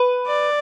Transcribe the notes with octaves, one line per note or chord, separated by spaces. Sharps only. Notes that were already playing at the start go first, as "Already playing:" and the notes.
Already playing: B4
D5